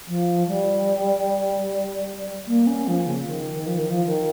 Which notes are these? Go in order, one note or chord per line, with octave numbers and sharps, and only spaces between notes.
F3
G3
A#3
C#4
F3
C#3
D#3
F3
D#3
F3
D#3